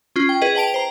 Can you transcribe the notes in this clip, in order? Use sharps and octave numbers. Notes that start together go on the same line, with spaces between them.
C#4 F4
G5
G#4 B4 D#5
B4 G5 A5 D7 F7
C5 A#5